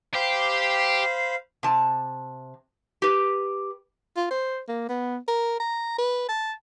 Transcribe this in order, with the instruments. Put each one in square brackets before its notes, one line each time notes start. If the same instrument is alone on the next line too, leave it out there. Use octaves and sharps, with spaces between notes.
[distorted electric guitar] G4 [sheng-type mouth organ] C5 F5 B5
[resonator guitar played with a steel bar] C3 A5
G4 B4
[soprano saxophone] F4
C5
A#3
B3
A#4
A#5
B4
A5